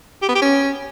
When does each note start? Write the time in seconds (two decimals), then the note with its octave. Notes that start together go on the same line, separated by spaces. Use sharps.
0.22 G4
0.28 B3
0.35 G4
0.42 C#4